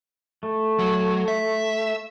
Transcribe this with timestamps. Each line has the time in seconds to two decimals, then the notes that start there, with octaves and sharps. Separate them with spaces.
0.43 A3
0.79 F#3
1.28 E5